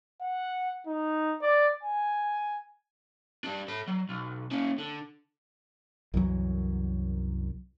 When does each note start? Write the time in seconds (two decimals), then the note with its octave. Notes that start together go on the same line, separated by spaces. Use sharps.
0.22 F#5
0.87 D#4
1.42 D5
1.83 G#5
3.44 G3 D4
3.68 A4 B5
3.88 F#3
4.09 B1
4.51 A#3 C#4
4.78 D3
6.14 C2 F#2 E3 F#3